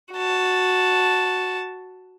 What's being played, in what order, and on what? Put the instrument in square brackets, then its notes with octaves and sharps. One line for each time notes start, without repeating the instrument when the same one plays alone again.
[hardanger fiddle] F#4 A5